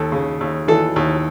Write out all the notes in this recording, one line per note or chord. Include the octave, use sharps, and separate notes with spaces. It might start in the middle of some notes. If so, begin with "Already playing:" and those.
Already playing: D#2 A4
C#3
D#2
E3 A4
D#2